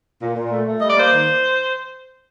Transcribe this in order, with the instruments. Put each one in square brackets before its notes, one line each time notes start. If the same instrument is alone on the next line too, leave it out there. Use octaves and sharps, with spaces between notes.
[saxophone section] A#2
A#2
A3
A3
G3 D#5
D5
A#3 C5
D#3